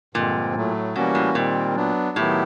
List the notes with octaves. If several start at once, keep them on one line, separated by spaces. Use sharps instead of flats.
G2 A#2 D3 F3 G#3 C4
A2 F#3 A3
B2 E3 G3 A#3 C#4 F#4
A2
A#2 D#3 G3 C4
F#3 B3 D4
A2 D#3 F#3 B3 E4 G4